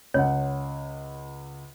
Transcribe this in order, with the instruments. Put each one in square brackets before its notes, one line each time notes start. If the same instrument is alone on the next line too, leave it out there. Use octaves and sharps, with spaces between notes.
[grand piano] C#2 F#5 [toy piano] C#5